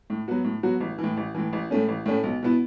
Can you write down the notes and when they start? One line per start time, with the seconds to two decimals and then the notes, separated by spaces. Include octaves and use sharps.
0.10 A2
0.28 F#3 B3 F#4
0.44 A2
0.63 F#3 B3 F#4
0.80 A1
0.98 E3
1.04 A2
1.17 A1
1.35 A2 E3
1.53 A1
1.71 A2 A3 C#4
1.88 A1
2.06 A2 A3 C#4
2.23 B1
2.43 B2 B3 E4